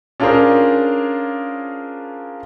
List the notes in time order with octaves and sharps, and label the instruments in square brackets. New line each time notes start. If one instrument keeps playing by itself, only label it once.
[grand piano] C#4 D4 F4 G#4 A#4 C5